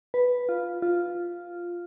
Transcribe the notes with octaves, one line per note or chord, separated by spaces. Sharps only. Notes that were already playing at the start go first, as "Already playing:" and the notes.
B4
F4
F4